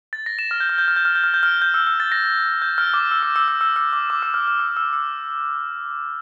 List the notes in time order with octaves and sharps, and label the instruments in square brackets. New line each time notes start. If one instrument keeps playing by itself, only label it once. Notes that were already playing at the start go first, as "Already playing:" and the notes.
[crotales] A6
A#6
E7
F6
G6
F6
G6
F6
G6
F6
G6
F6
G6
F6
G6
E6
E6
A6
A#6
G6
F6
D6
E6
E6
E6
E6
E6
E6
D6
D6
E6
F6
F6
E6
E6
E6